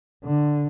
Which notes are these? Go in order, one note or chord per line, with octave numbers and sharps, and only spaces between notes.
D3